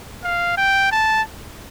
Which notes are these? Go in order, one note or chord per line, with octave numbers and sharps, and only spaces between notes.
F5
G5
A5